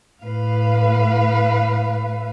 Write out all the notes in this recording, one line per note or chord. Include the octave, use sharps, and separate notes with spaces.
A2 B4 F5